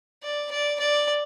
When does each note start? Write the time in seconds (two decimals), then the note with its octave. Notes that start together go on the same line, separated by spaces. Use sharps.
0.23 D5
0.51 D5
0.79 D5